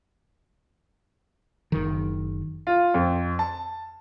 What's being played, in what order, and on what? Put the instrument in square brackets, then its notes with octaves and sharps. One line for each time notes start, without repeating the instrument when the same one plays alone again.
[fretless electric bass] F#1 D#3
[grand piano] F4
F2
A5